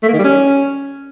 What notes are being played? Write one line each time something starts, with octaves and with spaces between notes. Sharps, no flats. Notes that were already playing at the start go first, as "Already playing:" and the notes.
A3
A#3
D#3
G3
C#4